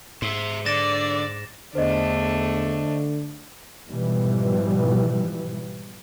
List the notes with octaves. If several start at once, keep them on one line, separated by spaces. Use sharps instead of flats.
G#2 C5 E5
D3 D5 A6 A#6 E7
E2 D3 A3 D4 C5 D#5
G#2 B2 E3 F3 G3